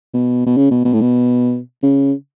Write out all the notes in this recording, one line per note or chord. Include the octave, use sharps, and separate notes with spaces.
B2
B2
C#3
B2
B2
A2
B2
C#3